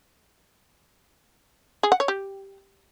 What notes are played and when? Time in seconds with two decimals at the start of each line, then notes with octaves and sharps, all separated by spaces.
1.83 G#4
1.92 F#5
2.00 C#5
2.08 G4